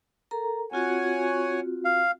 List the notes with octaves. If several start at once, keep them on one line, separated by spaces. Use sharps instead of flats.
A4 A#4 A#5
C4 F4 F#4 C#5 F#5 G#5
F5